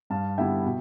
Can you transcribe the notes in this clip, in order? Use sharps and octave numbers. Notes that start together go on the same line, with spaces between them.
G2 F5 A5
D3 G3 B3 E4 E5 G5
B2